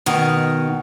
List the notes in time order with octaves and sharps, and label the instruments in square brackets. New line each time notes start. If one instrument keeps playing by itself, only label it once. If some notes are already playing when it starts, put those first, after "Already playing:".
[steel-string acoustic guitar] B2 D#3